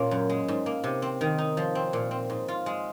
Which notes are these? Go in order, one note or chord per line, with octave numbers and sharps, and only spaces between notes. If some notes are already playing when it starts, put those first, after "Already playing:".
Already playing: A#2 A#3 C#4
F#2
G#3
G#2
A#3
C3
C4
D#3
D#4
F3
C4
A#2
C4
G#2
F4
G#3